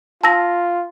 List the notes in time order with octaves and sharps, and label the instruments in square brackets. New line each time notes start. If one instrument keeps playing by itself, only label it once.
[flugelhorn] F4 [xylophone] A5 E6 A#6